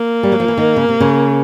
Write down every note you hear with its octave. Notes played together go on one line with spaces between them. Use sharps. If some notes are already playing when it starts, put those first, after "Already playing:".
Already playing: A#3
G3
F#3
F3
E3
D#3
C#3
C3
C#3